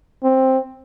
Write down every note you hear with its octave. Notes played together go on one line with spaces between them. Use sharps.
C4